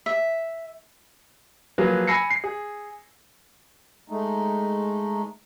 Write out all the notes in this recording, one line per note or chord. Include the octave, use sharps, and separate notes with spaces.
E5
F3 F#3 A#3 F4 G#4 B4
G#5 B5 E6 A#6 C7 C#7
C7
G#4
G#3 A3 D#4